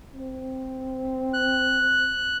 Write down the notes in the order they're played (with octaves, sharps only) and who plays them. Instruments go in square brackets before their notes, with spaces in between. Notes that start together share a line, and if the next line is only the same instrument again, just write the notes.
[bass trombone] C4
[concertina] F#6